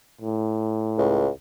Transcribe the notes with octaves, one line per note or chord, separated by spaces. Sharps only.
A2
C#2